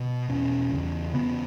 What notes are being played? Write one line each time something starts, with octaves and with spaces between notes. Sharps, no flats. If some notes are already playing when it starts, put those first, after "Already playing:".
Already playing: B2
E2 B2 C#4
E2 C#3
E2 C#3 B3